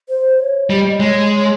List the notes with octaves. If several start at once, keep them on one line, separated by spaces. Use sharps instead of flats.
C5
C#5
G3 D#5
G#3 C#5
C#5